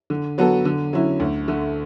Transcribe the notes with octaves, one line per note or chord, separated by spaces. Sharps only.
D3
F#3 B3 F#4 A4
D3
F#3 C#4 E4
D2
D3 A3